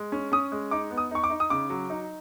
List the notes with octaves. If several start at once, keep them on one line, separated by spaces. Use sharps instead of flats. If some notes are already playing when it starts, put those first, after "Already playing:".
Already playing: G#3
C#4
C#4 D#6
G#3
D#4 D6
B3
D#6
D#4 C#6
D6
D#4
D#6
C#3 D6
F#3
D#4